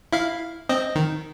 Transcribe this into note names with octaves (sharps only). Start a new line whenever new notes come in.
E4 F5
C4 D#5
D#3